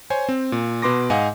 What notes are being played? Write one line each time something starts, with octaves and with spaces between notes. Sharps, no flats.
C5 C#5 G#5
C4
A#2
B2 B4 C6 D6 A#6
G#2 D#5 F5 F#5 G#5